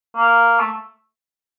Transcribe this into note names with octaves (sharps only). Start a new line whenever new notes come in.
A#3
A3